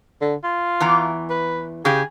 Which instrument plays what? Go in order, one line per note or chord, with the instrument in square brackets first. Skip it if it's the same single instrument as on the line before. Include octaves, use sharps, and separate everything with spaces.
[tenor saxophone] D3
F4
[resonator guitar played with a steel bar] E2 E3 A#5
[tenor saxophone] B4
[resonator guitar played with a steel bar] C#3 G4 [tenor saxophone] G#4